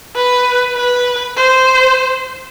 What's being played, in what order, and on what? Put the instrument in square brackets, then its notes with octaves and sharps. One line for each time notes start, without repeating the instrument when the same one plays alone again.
[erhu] B4
B4
C5